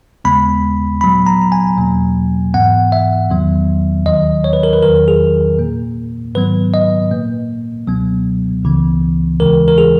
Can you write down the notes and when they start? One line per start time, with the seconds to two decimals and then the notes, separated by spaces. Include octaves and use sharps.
0.24 D#2 C#3 G#3 B3 B5
1.01 A#2 F#3 B3 B5
1.26 A#5
1.41 A#5
1.52 G#5
1.77 E2 B2 F#3 A#3
2.54 G#2 E3 B3 F#5
2.92 E5
3.30 E2 D#3 F#3 B3
4.06 D#2 D#3 F#3 D#5
4.44 C#5
4.53 B4
4.63 A#4
4.73 B4
4.82 E2 D#3 F#3 A#4
5.08 G#4
5.59 A#2 A#3
6.35 G#2 D#3 F#3 B3 B4
6.74 D#5
7.11 A#2 A#3
7.87 C#2 B2 F#3 B3
8.64 C#2 C#3 E3 B3
9.40 D#2 C#3 E3 G#3 A#4
9.68 A#4
9.78 G#4